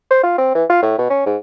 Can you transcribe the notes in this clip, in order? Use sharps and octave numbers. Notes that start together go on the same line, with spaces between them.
C5
F4
C4
E3
F4
A2
B2
C#4
G#2